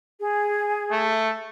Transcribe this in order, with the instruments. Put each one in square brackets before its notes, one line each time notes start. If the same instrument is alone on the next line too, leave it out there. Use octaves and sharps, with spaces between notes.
[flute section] G#4
[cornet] A3